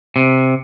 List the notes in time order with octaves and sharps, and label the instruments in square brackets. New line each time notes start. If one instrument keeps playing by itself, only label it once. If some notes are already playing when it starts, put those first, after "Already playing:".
[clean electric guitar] C3